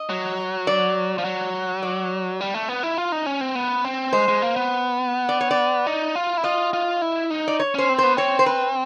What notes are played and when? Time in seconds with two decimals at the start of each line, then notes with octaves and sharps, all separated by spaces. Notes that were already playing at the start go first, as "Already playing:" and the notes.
Already playing: D#5
0.09 F#3
0.67 D5
1.18 F3
1.25 F#3
1.83 D5
2.41 G3
2.54 A3
2.69 B3
2.83 E4
2.98 F4
3.12 D#4
3.26 C#4
3.41 C4
3.55 B3
3.85 C4
4.13 G#3 C5
4.28 G#3
4.42 A#3
4.56 B3
5.29 D5
5.41 C#5
5.51 D5
5.87 D#4
6.16 F4
6.37 E4
6.44 F4 D#5
6.73 F4
7.02 E4
7.30 D#4
7.48 D5
7.60 C#5
7.75 C#4 C5
7.89 C4
7.98 B3 C5
8.17 C4 C#5
8.39 C5
8.46 B4